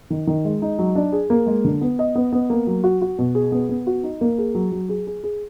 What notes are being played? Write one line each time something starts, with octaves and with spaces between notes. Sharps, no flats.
D#3
D#3
G#3
D#4
F#3
D4
G#4
A#3
G#3
D3
B3
D#5
B3
B3
A#3
F#3
F#4
F#4
B2
G#4
B3
B3
F#4
D#4
A#3
G#4
F#3
F#3
G#4
G#4
G#4